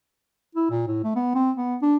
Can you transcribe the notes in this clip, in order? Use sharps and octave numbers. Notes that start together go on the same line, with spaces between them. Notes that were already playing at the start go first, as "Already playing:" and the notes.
E4
A#2
A2
A3
B3
C4
B3
D4